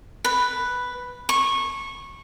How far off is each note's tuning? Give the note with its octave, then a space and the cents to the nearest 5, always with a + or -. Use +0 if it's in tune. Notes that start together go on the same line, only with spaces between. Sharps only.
B4 +0
C#6 -20